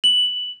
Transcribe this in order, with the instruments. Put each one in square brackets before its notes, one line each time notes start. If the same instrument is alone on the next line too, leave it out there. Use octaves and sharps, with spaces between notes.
[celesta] F#7